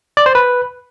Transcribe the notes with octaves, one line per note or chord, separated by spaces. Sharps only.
D5
C5
B4